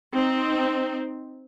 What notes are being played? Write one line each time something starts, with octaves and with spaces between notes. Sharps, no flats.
C4 D#4